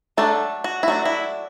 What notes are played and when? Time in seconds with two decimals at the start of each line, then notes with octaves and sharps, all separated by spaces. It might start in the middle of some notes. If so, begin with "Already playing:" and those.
0.17 F#3 A3 D4 A4
0.64 F#4
0.83 E4
0.88 F#3 A3 D4 F#4
1.05 E4